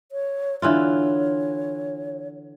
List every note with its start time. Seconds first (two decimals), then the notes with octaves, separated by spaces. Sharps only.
0.12 C#5
0.62 D3 E3 F4 C#5